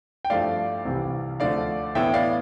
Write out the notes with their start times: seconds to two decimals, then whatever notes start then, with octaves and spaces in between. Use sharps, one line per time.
0.25 G5
0.30 G2 F3 A3 E4 D5 F5
0.85 C2 C3 E3 G3
1.40 D2 D3 F3 A3 D5 F5
1.95 A2 E3 B3 E5 G5
2.14 D5 F5